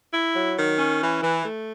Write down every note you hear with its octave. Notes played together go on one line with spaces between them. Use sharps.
E4
F#3
D#3
C#4
E3
E3
A3